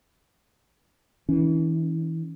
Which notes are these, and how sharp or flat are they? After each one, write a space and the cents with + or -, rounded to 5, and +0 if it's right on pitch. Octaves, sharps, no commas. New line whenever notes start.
E3 -30 C#4 +20